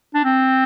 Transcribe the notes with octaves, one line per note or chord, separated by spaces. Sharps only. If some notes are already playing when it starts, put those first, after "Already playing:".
D4
C4